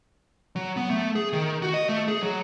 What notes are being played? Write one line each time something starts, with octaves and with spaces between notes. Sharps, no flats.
F#3
B3
A3
G#4
D#3
F#4
D#5
A3
G#4
F#3